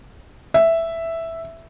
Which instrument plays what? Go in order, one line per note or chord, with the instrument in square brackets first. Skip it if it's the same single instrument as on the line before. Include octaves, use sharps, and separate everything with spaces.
[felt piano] E5